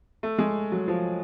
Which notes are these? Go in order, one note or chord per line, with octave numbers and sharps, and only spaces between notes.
A3
G#3
F#3
F3